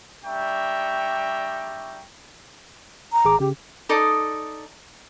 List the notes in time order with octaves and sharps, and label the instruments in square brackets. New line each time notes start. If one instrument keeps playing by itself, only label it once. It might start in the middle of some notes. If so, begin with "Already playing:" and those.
[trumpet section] G3 D4 E5 G5 A#5 C#6
[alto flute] A#5
[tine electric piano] G#1 G#4 D6
[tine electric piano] C#3 [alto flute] G4
[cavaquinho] D#4 A4 D5 D#6